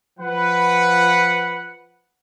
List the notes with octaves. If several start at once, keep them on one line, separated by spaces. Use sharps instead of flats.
F3 B4 F#5